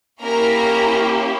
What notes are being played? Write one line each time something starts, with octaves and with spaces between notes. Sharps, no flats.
A#3 C#4 E4 G4 A#4 A#5